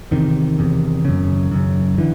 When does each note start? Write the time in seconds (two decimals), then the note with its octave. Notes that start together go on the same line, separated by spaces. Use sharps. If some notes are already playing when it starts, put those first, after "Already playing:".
0.11 E2 C3 D#3
0.59 E2 C3
1.05 F#2 C#3
1.52 F#2 C#3
1.98 D3 E3